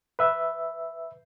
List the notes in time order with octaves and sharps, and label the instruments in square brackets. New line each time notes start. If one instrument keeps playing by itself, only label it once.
[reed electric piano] B4 E5